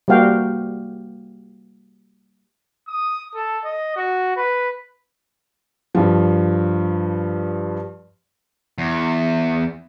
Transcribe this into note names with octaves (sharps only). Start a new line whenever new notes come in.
G3 A#3 F#4 F5 G5
D#6
A4
D#5
F#4
B4
G2 F3
E2